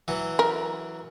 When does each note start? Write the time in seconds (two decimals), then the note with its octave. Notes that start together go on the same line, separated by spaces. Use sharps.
0.08 E3 F#3
0.39 A#4